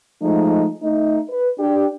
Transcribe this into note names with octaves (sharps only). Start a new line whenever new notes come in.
F3 G#3 A3 D#4
A3 D#4
B4
D4 G4